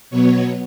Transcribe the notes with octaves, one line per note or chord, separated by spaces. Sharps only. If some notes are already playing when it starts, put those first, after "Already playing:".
B2 F#3 B3 C#5